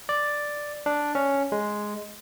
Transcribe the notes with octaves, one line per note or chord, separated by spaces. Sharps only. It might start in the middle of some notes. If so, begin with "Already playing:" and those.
D5
D4
C#4
G#3